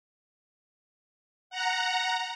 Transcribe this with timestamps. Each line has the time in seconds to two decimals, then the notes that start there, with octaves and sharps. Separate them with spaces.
1.50 F#5 A#5